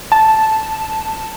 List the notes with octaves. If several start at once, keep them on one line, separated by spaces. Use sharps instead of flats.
A5